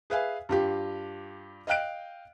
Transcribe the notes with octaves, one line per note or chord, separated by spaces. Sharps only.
G#4 B4 E5 F5 G#5
G2 F4 G4
D#5 F5 G5 F#6 D7